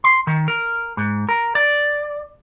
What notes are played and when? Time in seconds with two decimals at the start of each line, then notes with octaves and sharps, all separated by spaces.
0.04 C6
0.27 D#3
0.48 A#4
0.97 G#2
1.29 A#4
1.55 D5